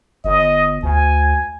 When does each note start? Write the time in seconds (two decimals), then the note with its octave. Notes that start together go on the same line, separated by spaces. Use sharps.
0.25 G1 D#5
0.83 D2 G#5